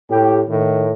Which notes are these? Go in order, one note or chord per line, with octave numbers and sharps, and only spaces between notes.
A2 G4
A2 D#3